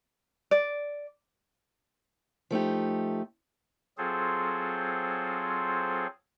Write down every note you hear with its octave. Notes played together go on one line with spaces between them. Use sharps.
D5
F3 A3 D#4 G4
F#3 C4 F4 G#4 A4 C5